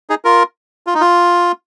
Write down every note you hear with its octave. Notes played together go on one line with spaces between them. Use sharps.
D#4 G#4
F4 A#4
F4
D#4
F4